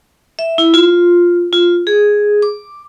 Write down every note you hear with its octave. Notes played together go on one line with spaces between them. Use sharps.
E5
E4
F4
F4
G#4
D6